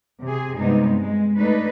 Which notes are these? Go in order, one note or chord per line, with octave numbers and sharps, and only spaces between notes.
C3 G#4
G2 C3 G#3 B3 D#4
G#3
A3 D4 D#4 B4